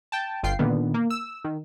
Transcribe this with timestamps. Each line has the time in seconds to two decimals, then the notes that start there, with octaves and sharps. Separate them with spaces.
0.12 G5 A5
0.43 G1 F4 G5 C7
0.59 A#2 D3 D#3 B3
0.94 A#3
1.10 E6
1.45 D#3